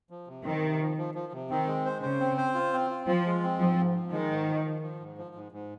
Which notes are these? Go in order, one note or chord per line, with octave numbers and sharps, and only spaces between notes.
F3
C3
D#3 C4
C3
F3
F3
F3
C3
D#3 C4
G#3
C5
C#3 C5
C4
C5
F4
C4
F4
F3 F4
G#3
C4
G#2 F3
G#2
F3
D#3 G#3
G#2
F3
F3
F3
G#2
F3
G#2
G#2